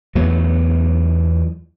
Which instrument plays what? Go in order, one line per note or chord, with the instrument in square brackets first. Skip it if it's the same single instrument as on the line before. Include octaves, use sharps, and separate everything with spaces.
[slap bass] E2 F#3 A3 B3